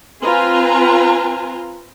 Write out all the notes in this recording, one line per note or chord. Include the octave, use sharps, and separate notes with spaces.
C4 F4 B4 G#5 A#5 C6